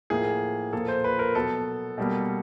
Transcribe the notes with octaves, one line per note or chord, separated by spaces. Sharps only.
A2 F3 A#3 G#4
A#2 F3 A#3 A4
C5
B4
A#4
B2 F#3 B3 A4
B2 G3 A#3